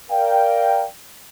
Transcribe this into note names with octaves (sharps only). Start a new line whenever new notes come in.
A#4 D5 F5 G5